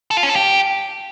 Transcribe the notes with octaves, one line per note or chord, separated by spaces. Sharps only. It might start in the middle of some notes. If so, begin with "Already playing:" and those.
A4
F4
C#4
A4
G4